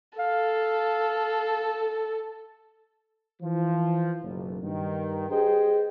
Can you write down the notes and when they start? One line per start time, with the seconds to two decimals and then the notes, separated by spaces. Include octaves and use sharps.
0.19 A4 F5
3.42 E3 F3
4.22 F#1 B1
4.63 G2 D#3
5.30 G4 G#4 B4 C5 D#5 G5